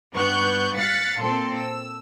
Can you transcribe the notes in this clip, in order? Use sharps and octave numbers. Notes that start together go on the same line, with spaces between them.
G2 B3 C#6 F#6 G6
F5 F#6 A6 B6 C#7
A#2 C4 A4 C6
E6